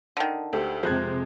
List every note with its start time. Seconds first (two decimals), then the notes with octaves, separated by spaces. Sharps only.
0.17 D3 D#3
0.53 D2 G4 A4 C5
0.83 F2 C3 F3 G#3 C5 F#6 G#6